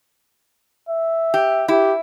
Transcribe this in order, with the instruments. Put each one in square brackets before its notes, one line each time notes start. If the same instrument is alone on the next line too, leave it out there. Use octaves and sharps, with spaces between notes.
[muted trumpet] E5
[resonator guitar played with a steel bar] G4
[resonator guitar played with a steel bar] E4 [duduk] G4